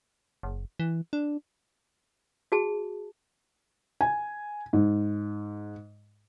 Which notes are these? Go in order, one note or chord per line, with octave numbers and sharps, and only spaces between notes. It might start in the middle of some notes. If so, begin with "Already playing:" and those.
F#1
E3
D4
F#4 G#4 A5
G#5
G#2